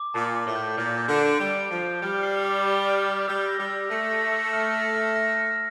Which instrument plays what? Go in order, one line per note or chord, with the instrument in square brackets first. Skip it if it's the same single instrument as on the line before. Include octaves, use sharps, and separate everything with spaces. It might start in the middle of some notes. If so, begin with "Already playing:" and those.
Already playing: [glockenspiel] D6
[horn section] A#2 [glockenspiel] A5
[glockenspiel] D6
[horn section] A2
[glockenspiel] G6
[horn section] A#2 [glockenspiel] G6
[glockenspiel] G6
[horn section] D3
[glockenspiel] D7
[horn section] G3 [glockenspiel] D7
[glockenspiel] D7
[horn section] F3
[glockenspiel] G6
[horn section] G3 [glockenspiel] F6
[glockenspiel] C7
D6
D6
F6
F6
[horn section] G3 [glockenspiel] E6
[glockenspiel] A#6
[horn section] G3
[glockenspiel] E6
[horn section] A3 [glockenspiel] A#6
[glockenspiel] A#6
E6
F6
A#6
F6
A#6
F6